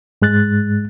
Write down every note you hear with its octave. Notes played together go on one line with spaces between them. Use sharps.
G#2 G#3 F#6 A6